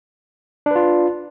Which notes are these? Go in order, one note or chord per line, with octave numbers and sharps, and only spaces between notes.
D4 F4 B4